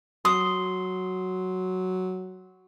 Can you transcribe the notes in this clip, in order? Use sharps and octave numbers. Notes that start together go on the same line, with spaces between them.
F#3 C6 D#6